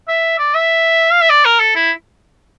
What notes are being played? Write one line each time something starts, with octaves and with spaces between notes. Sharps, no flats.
E5
D5
E5
F5
E5
D5
A#4
A4
E4